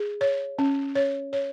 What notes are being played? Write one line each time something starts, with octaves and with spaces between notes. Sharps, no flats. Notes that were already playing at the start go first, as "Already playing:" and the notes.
Already playing: G#4
C#5
C#4
C#5
C#5